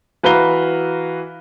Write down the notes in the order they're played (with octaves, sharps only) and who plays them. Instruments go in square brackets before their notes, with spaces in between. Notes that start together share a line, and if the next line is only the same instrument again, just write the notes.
[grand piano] E3 F#4 B4 F5 A#5 G7